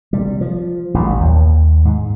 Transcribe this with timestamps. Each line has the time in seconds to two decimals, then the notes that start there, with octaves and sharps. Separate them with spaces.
0.13 C3 G3
0.41 F3
0.94 A1 A#2 F#3 G3
1.20 D#2
1.85 G#2